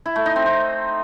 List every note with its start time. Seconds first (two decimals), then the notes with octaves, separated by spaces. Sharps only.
0.06 E4
0.16 A3
0.26 D#4
0.36 C4
0.46 C4